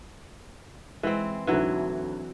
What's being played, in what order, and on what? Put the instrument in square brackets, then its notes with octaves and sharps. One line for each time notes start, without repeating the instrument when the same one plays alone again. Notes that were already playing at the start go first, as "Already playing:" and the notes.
[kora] E3 C4 [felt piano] G#3
[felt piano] D2 G#2 [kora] E3 F#3